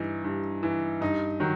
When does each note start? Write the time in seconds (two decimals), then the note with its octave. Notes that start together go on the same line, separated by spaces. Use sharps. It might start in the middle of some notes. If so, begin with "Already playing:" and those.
Already playing: G2 E3 D#4
0.24 G2
0.63 E3
1.01 G2 D#4
1.40 D#3 F#3